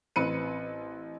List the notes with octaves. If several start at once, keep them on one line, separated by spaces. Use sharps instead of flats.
A1 C4 B4 C#7 D#7